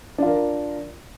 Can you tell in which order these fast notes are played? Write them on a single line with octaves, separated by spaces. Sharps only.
D4 F4 A#4